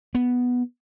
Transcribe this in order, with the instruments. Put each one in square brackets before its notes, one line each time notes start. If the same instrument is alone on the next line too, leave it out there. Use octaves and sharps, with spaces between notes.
[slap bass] B3